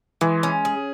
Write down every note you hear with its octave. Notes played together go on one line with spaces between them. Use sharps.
E3 G#3
C#4
G#4